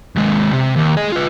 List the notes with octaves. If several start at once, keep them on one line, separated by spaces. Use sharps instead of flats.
D#2 G#3
C3
D#2
G#4 D#5
F4 B4